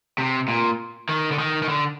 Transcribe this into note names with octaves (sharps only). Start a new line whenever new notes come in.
C3
A#2
D#3
D3
D#3
D#3
D3